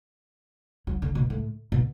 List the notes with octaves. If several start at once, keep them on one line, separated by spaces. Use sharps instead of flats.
F#3
D3
B2
A2
B2